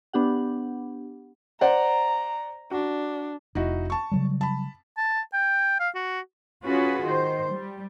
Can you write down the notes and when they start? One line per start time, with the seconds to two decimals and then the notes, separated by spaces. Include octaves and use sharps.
0.13 B3 D4 G4 F#5
1.61 C5 D5 F#5 A#5
2.71 D4 F#4
3.55 F1 D#4 E4 F#4
3.90 A5 C#6
4.12 C#3 F#3 G3
4.41 A5 B5
4.98 A5
5.34 G5
5.80 F5
5.95 F#4
6.64 C#4 F4 F#4 G#4 B4
7.03 D#3 C5
7.51 G3